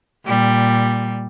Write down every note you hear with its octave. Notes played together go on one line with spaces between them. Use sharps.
A#2 G3